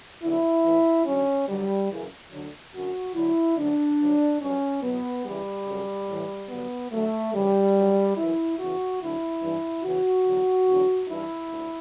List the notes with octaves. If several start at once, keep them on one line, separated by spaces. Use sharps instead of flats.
E2 D3 F#3 E4
A2 E3
D2 D3 F#3 C#4
G2 D3 F#3 G3
F#2 C#3 E3
D2 D3 F#3
F#2 D3 F#3 F#4
D2 D3 F#3 E4
D2 D3 F#3 D4
G2 D3 F#3
G2 F#3 C#4
E2 B2 F#3 B3
E2 C#3 E3 G3
F#2 C#3 F#3
A2 E3
G2 D3 F#3 B3
D2 D3 F#3 A3
D2 C#3 E3 G3
G2 F#3
F#2 E3 E4
E2 C#3 E3 F#4
D2 D3 F#3 E4
G2 E3
E2 C#3 E3 F#4
E2 D3 F#3
E2 D3 F#3
G2 E3 E4
D2